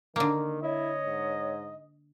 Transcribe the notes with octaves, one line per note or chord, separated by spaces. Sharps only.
D3 D#3 A#3
E4 C#5 D#5
G#2